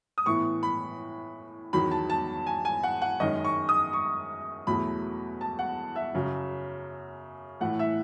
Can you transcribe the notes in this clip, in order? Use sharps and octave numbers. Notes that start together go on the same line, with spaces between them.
D#6
A2 E3 B3 C#6
B5
E2 D#3 F#3 B5
A5
A5
G#5
G#5
F#5
F#5
F#2 D#3 G#3 C#4 D#5
C#6
D#6
C#6
E2 B2 F#3 A3 B5
A5
F#5
E5
F#2 C#3 F#3
A2 E3 A3 F#5
E5